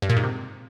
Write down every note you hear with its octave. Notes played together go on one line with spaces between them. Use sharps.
G2
A#2
G#2
C3